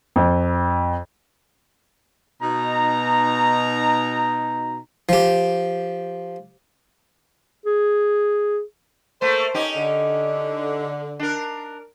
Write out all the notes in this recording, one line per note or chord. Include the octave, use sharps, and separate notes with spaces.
F2
B2 D#4 A#5
F3 G4
G#4
A3 A#3 C5
C#4 D#4 G4
D3
D4 A#4